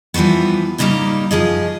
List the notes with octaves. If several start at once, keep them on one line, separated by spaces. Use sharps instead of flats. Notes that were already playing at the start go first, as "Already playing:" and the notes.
E3 F3 G3 A3 B3
G#2 C#3 G3 A3 A#3 D#4
F#2 F3 G#4 D#5